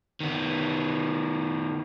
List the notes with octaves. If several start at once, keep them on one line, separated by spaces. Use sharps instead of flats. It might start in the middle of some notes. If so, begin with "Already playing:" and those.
D#3 B3